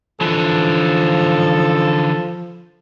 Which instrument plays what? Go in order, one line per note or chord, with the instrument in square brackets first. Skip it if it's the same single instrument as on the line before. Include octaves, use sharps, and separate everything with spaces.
[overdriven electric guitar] D3 E3 [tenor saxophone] F3 [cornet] A4